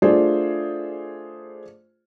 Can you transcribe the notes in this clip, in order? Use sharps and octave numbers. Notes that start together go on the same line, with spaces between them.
A3 D4 F4 G#4 C5 D5